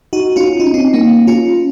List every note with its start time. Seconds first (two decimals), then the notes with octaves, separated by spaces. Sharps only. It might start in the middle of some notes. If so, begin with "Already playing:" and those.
0.13 D#4 F#4
0.36 C#4 F4
0.60 D#4
0.66 C#4
0.74 C4 D#4
0.94 A#3 C#4
1.27 C#4 F4